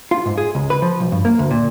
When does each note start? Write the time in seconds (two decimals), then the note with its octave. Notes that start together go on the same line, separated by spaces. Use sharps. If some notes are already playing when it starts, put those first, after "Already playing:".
0.11 F4
0.26 G#2
0.38 G#4
0.55 C#2
0.70 B4
0.82 F3
1.00 B1
1.12 G2
1.25 A#3
1.39 D2
1.51 A#2